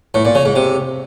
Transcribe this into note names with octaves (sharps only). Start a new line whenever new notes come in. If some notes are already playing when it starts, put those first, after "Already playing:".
A2
A#2
C#3
G#2
C3